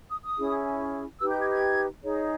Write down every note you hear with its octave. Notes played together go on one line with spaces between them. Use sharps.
D#6
D#6
C#4 E4 G#4
D#4 G4 B4 E6
G6
G#6
G#6
D#4 G#4 C#5